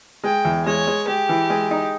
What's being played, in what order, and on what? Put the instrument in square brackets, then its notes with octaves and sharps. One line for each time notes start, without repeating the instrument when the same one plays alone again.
[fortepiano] G#3 [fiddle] G5
[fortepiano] E2
[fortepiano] G#3 [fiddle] C#5
[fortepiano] G#3
[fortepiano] G#3 [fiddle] G4
[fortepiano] E3
G#3
D#4